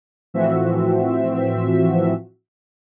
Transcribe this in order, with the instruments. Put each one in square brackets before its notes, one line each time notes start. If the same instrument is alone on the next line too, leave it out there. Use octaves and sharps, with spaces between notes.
[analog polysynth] A2 E3 F3 C4 F#4 E5